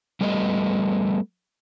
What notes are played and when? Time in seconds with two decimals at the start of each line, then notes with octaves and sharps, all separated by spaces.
0.21 G3 A3 B3 D#5